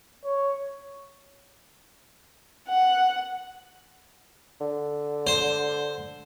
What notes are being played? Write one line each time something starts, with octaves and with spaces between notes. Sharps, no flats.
C#5
F#5
D3
C5